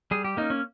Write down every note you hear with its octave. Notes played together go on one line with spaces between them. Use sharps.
G3 G#4
G4
A#3 C#4 D#4
C#4